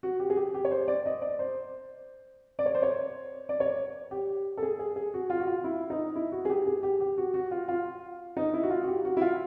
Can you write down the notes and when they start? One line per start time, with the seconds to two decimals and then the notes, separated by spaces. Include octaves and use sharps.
0.03 F#4
0.20 G4
0.30 G#4
0.37 G4
0.54 G4
0.65 C#5
0.71 C5
0.88 D5
1.06 D#5
1.22 D5
1.39 C5
2.59 D5
2.66 C#5
2.75 C5
2.82 C#5
3.49 D5
3.60 C#5
4.11 G4
4.57 A4
4.62 G#4
4.79 G#4
4.96 G#4
5.14 F#4
5.30 F4
5.40 F#4
5.47 F4
5.64 E4
5.90 D#4
6.15 E4
6.32 F#4
6.45 G#4
6.50 G4
6.66 G#4
6.83 G4
7.00 G4
7.18 F#4
7.34 F#4
7.51 F4
7.68 F4
8.37 D#4
8.54 E4
8.63 F#4
8.70 F4
8.83 F#4
8.87 G4
9.05 F#4
9.17 E4
9.21 F4